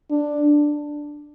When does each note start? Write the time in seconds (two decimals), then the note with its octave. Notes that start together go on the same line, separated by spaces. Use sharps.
0.10 D4